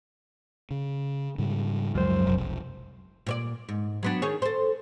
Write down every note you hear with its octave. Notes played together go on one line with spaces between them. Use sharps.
C#3
G#2 C#3 G3
C#2 F#2 F3 G#3 C5
F1 B1
A#2 C#5 D5
G#2
F#3 B3 D4
D#3 G#4 C#5
A4 C5